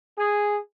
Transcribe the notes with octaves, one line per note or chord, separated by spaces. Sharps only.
G#4